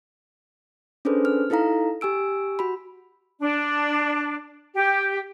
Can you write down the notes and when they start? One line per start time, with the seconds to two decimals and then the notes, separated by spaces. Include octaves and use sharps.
1.05 C#4 D4 G#4 A4 B4 C5
1.25 F6
1.50 D#4 E4 A4 F5 A#5
2.01 G4 G#5 E6 D7
2.59 F#4 B5
3.40 D4
4.75 G4